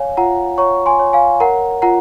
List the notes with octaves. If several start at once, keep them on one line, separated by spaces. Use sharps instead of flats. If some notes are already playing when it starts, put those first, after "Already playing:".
Already playing: C#5 F5 G#5
F4 F#5 A#5
C#5 A#5 C#6
G#5 C6
C#5
F5 G#5
A#4 F#5 A#5
F4 F#5 A#5